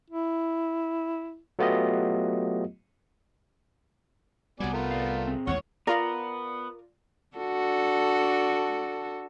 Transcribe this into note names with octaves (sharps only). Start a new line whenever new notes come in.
E4
F#3 A3 B3 F4 G4 D#5
C2 F#3 G3 B3 D5 G#5
A3 F4 A#4
D5 F5
C4 G#4
A1 D#2 G#3 C#5 F#5
B3 F4 A#4 D5
D4 F#4 A4